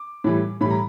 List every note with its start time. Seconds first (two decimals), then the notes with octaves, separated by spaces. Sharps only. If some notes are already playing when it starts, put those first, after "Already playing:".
Already playing: D6
0.24 A2 E3 G3
0.61 A2 E3 G3 B5
0.71 A#5